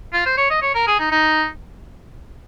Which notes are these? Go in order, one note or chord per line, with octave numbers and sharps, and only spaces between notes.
F4
C5
C#5
D#5
C#5
A#4
G#4
D#4
D#4